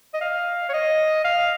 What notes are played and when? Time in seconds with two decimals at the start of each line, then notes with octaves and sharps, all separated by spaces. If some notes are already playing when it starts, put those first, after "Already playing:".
0.14 D#5
0.21 F5
0.69 C#5
0.73 D#5
1.24 F5